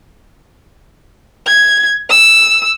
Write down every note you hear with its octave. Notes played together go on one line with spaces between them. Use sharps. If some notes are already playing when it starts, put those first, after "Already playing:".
G#6
E6